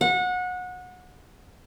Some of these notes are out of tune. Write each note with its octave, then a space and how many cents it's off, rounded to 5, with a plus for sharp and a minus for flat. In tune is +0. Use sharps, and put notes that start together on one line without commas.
F#5 -25